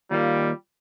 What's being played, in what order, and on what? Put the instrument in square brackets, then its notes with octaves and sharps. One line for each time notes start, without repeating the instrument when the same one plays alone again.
[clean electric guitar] D#2 A#3 [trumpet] G3 [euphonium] F4